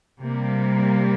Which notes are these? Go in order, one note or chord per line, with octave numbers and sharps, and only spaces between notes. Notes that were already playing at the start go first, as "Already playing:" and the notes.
C3 G3 A#3